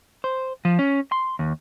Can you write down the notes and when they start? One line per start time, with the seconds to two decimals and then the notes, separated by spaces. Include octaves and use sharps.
0.24 C5
0.65 F3
0.79 C#4
1.12 C6
1.39 D#2